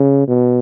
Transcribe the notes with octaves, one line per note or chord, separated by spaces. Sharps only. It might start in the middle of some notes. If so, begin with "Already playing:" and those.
Already playing: C#3
B2